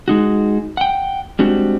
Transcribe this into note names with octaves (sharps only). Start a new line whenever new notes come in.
G#3 D#4 F#4
F#5 G5
G3 G#3 C4 D4 F#4